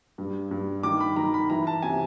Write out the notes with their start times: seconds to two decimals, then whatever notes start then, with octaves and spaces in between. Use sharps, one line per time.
0.18 G2
0.51 G2
0.83 D#3 D6
1.00 B5
1.16 D#3 A#5
1.34 B5
1.50 E3 A#5
1.67 A5
1.82 C3 G#5